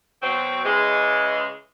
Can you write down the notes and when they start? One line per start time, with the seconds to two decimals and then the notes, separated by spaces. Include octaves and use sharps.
0.21 B2 F#3 C4
0.65 C#3 E3 G#3